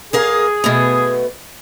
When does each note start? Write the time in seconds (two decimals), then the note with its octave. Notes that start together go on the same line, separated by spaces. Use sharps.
0.13 E2 G#4 A#4 F5
0.64 B2 A3 B3